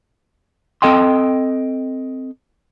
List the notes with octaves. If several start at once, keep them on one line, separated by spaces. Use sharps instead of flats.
C4 A4 D#5 G5 C6